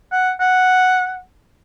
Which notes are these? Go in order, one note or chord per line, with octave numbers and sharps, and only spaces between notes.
F#5
F#5